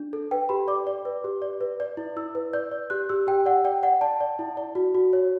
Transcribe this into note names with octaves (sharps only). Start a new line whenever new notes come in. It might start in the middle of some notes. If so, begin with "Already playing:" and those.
Already playing: D4
A4
B4 G5
G4 B5
D5 D6
D5
B4
G4
D5
B4
D5
E4
E4 E6
B4
D5 G6
D5
G4 F#6
G4 E6
G4 G5
D5 F#5
D5 G5
D5 F#5
D5 A5
D5
E4
D5
F#4
F#4
C#5